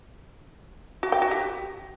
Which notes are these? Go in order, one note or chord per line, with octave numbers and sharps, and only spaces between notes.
F#4
G5
F#4
G4